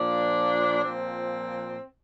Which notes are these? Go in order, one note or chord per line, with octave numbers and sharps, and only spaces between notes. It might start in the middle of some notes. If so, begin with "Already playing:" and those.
Already playing: A#2 F3 D4
A#2 F3 C4